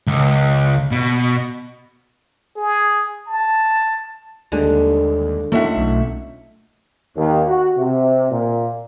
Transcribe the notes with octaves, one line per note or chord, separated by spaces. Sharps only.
C#2
B2
G#4
A5
D#2 D3 G3 G#3 D4
A3 C#4 D#4 F4 E5 F#5
B1
D#2
F#4
C3
A#2